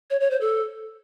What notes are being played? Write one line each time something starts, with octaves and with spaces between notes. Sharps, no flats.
C#5
C#5
C5
A4